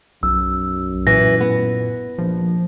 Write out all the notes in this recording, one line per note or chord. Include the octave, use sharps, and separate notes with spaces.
B1 F#2 E6
A#2 E3 A#6
B3
A#1 F3